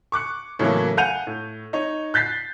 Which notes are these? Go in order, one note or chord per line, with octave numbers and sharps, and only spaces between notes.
C#6 D6 F#6 C#7
A2 C#3 E3 F#3 A3 A#3
F5 F#5 G#5 G6 D#7 F7
A2
D#4 C#5
F#6 G6 A6 B6 C7